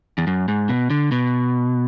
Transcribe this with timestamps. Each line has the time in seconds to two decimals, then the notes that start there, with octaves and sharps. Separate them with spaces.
0.18 E2
0.27 F#2
0.48 G#2
0.69 B2
0.90 D3
1.12 B2